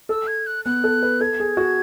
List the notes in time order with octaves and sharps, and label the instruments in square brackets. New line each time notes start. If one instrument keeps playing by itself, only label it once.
[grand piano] A4 [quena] E6
[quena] G#6
F#6
[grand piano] B3 [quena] F#6
[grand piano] A4
B4
[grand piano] A4 [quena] G#6
[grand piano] G#4
F#4